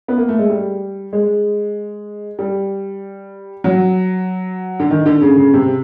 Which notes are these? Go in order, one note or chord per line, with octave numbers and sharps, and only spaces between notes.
B3
A#3
A3
G#3
G3
G#3
G3
F#3
D3
D#3
D3
C#3
C#3
C3